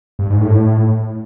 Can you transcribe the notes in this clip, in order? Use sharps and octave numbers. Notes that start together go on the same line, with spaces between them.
G2
G#2
A2